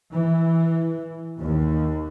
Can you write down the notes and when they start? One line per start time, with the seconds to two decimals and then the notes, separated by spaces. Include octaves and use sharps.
0.10 E3
1.41 D#2